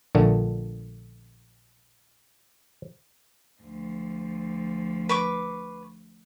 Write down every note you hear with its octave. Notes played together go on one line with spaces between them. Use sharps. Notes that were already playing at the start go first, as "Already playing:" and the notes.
A#1 A#2 D3 A3
D2 F3
B4 C#6 D6